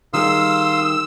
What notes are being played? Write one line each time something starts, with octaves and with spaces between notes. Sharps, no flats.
D#3 G3 G#4 F5 C6 D#6 E6